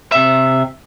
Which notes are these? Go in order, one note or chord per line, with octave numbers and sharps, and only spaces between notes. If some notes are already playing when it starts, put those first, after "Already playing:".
C3 E5